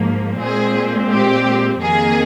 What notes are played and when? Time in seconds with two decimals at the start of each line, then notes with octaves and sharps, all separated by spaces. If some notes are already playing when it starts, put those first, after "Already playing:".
Already playing: G#2 F3 A#3
0.40 A#2 G#3 C4 G#4
1.11 G4
1.81 F2 D#3 A#3 G#4